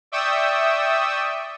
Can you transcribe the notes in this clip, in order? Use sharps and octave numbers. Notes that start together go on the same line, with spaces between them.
D5 E5 G5 C#6 D#6 E6